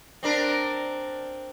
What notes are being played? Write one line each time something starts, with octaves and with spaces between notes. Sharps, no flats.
C4 D4 A#4